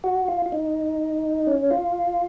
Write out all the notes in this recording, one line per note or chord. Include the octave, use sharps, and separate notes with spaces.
F#4
F4
F4
D#4
C#4
F4